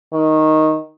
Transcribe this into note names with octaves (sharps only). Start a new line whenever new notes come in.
D#3